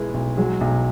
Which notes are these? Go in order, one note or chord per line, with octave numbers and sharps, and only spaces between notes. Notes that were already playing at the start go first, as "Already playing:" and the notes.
Already playing: B1 B2 G#3 B3 E4
B1
F#3 G#3
B1